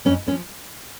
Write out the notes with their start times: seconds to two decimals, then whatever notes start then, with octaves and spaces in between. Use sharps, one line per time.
0.05 F2 C#4
0.27 D3 C#4
0.30 F3